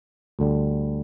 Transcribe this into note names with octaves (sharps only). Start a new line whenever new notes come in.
D2 D3 G3